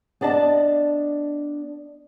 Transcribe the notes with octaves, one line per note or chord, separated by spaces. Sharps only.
B3 D4 D5 D#5 A5